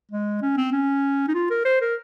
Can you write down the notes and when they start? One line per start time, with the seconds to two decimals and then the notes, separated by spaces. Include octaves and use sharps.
0.11 G#3
0.42 C#4
0.57 C4
0.72 C#4
1.28 D#4
1.34 F4
1.50 A#4
1.65 C5
1.81 A#4